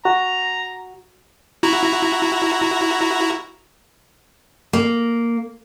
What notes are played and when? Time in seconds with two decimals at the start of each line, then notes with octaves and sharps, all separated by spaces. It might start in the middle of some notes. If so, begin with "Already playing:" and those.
0.05 F#4 A#5
1.63 E4 F#4 A#5
4.73 A#3